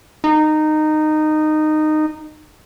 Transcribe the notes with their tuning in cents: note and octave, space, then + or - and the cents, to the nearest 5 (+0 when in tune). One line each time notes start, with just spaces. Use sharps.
D#4 -15